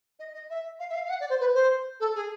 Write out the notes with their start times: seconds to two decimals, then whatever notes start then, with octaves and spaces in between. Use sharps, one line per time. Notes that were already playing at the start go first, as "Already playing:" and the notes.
0.19 D#5
0.33 D#5
0.49 E5
0.79 F5
0.89 E5
0.94 F5
1.04 F5
1.09 F#5
1.20 D5
1.29 C5
1.40 B4
1.54 C5
2.00 A4
2.15 G#4